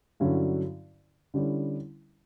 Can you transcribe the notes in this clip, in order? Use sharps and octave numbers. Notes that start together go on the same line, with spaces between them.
G2 D3 F#3 C#4 E4
D3 G3 C#4 E4